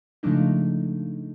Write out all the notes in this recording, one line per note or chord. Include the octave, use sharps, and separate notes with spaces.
C#3 F3 G#3 A3 D4 D#4